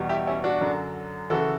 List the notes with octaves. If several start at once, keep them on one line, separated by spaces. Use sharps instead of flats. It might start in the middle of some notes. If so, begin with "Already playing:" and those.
Already playing: E2 B2 G3
E4 G4
C#4 E4
D4 F#4
F#2 D3 F#3
C#3 E3 F#4 A4